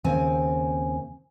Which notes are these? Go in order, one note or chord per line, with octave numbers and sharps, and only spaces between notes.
D#2 C#3 C4 G#5